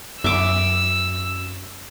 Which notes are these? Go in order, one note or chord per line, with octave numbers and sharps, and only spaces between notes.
F#2 E5 D6 E6